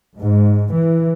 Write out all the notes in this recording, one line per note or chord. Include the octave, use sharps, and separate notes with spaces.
G#2
E3